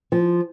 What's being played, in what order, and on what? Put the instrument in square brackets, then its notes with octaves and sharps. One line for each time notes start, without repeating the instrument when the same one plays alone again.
[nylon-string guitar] F3